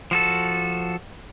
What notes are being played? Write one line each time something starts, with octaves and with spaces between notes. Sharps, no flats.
F3 F#4 A4